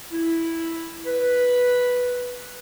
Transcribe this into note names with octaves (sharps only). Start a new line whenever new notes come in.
E4
B4